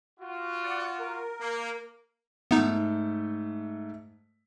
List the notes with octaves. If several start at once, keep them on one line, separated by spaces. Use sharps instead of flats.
F4 F#4
D5 F#5
A#4
A#3
G#2 A3 B3 D#4